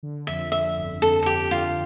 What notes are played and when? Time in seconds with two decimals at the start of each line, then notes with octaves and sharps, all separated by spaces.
0.03 D3
0.27 F2 E5
0.52 D3 E5
0.77 G1
1.02 F2 A4
1.23 A4
1.26 F2 G4
1.51 D3 F4